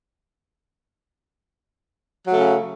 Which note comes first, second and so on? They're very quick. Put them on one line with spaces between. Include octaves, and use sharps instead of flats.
F#3 A3 C#3